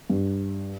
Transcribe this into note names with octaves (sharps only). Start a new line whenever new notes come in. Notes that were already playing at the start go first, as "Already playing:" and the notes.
G2